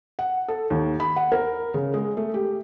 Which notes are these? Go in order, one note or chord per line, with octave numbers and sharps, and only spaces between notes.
F#5
A4
D#2
B5
F#5
A#4
C#3
G#3
A3
G4